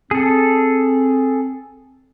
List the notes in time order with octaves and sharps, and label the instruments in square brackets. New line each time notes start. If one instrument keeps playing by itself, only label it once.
[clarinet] C4 [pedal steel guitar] G#4 A4